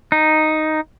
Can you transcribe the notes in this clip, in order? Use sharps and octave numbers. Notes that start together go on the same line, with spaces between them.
D#4